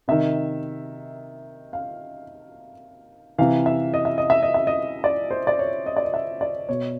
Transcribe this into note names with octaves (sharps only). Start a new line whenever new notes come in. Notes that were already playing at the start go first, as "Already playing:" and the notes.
C3 D#3 E5
F5
C3 E3 F5
E5
D#5
E5
D#5
E5
D#5
E5
D#5
D5
C5
D5
C#5
D#5
D5
D#5
E5
D5
B2 C#5